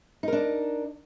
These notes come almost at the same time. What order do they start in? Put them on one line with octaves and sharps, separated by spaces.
D#4 A#4 D4